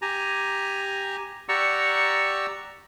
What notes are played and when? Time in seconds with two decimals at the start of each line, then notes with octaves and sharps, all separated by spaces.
0.02 G4 G#5 A#5
1.49 G4 D5 F#5 A#5 C#6 E6